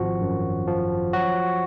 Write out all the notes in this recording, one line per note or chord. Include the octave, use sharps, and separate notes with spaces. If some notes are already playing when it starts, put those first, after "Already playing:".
Already playing: G#1 F3 F#4
F#2
F3
F#3 F#4